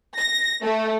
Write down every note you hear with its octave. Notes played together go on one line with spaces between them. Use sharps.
A#6
A3